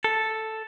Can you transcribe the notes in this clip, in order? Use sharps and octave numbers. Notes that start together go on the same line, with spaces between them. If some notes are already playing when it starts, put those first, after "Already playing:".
A4